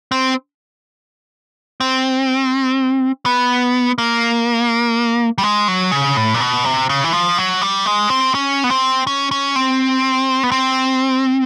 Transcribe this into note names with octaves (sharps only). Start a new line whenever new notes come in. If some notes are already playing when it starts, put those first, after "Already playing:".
C4
C4
B3
A#3
G3
G#3
F#3
C#3
A2
A#2
B2
C3
C#3
E3
F3
F#3
G3
G#3
C4
C#4
B3
C4
C#4
C#4
C4
B3
C4